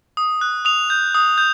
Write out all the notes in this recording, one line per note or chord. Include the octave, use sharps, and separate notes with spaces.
D#6
F#6
D#6 F7
G6
D#6
G6